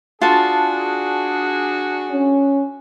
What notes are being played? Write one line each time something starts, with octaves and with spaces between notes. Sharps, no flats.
D4 F4 F#4 G#4 A5
C#4